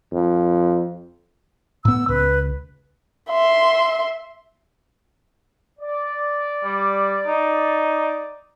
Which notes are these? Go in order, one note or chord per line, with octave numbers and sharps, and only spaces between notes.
F2
A2 B3 E6
C#2 B4
E5 C6
D5
G3
D#4